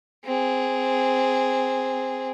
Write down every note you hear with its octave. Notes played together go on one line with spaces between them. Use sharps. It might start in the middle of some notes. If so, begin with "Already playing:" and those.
C4 G#4